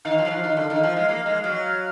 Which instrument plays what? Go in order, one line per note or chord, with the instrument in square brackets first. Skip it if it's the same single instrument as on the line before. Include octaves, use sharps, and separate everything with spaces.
[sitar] D#3 [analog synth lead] F5
[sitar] F3
F#3
F3
D#3
D3
D#3
F3
G#3
A#3
G#3
F#3